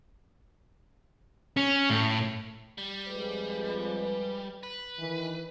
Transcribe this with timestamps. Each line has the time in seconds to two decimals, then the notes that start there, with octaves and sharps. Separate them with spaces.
1.57 C#4
1.90 A2
2.78 G3
3.08 F2 G#3 B4
4.63 B4
4.98 D#3 E3